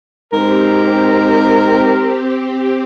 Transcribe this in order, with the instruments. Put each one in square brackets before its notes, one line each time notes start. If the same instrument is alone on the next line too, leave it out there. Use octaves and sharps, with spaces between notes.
[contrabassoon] G#2 [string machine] C4 G4 [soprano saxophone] A#4